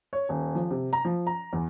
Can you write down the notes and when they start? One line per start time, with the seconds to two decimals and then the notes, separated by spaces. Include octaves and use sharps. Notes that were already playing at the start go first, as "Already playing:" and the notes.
0.13 C#5
0.29 D#1
0.55 F3
0.71 C3
0.93 A#5
1.05 F3
1.27 A#5
1.53 E2